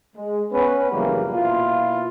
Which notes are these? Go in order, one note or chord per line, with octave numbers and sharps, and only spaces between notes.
G#3
B3 C#4 B4
A#1 F#2 C#3 E3 G3 A#3
B2 A#3 E4 F4